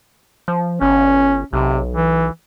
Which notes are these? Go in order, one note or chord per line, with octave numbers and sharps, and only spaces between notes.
F3
G1 C#4
B1 C3
E3